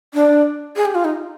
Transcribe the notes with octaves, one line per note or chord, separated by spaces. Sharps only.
D4
G#4
G4
F4
D#4